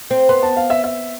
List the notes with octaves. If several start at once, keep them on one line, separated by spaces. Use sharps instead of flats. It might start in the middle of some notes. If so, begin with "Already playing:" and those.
C4
B3 C6
A5
F5
E5
E5